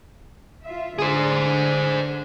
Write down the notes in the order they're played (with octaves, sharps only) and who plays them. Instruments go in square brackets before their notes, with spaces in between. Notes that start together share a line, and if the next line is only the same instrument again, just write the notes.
[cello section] F4 E5
[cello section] D3 [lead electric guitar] G#4 C5